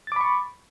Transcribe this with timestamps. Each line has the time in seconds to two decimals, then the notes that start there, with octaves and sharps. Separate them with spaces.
0.07 A6
0.12 D6
0.16 B5
0.21 C#6